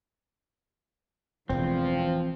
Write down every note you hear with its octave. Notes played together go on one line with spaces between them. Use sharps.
E1 E2 A2 E3 F3 C4